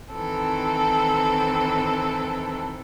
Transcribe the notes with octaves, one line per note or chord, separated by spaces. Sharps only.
D#3 E3 C4 A4